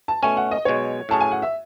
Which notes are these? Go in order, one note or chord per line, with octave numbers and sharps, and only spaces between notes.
A5
B2 A3 C#4 G#5
F#5
D#5
B1 B2 G#3 C#5
A2 F#3 C#4 G#4 A5
G#5
F#5
E5